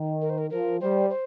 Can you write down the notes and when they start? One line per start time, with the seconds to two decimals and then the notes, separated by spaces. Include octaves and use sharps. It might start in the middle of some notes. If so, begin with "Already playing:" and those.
Already playing: D#3
0.21 A#4
0.30 C5
0.38 A#4
0.50 F3 A#4
0.80 G3 C5
1.10 C5